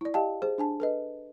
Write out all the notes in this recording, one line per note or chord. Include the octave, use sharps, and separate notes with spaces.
E4 D5
G4 D#5 F5 G5 A5
G#4 C5
D4 G#5 A5
A4 B4 D#5